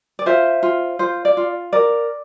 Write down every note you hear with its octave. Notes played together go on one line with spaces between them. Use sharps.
D5
F4 C5 E5
F4
F4 C5
D5
F4
A#4 D5